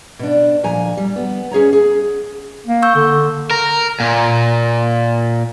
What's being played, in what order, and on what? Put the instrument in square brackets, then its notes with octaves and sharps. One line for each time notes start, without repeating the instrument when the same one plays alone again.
[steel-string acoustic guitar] B2 D4
D2 A#2 F3 G#5 A#5
G3
B3
C#4 G#4 C#5 A#5
G#4
[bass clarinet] A#3
[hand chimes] C#6 E6 G6
[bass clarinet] D3
[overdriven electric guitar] A#4
A#2